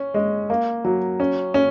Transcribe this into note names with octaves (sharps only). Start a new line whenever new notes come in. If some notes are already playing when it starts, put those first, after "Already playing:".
Already playing: C#4
G#3
A#3
F#3
C#4
C#4